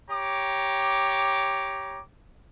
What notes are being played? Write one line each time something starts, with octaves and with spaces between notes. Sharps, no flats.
G4 C#5 A#5 D6